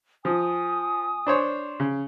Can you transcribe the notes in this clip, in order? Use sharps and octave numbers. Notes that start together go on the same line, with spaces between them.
F3 G#5 D#6
D4 C5 C#5
C#3